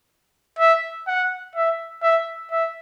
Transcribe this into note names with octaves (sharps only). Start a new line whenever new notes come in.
E5
F#5
E5
E5
E5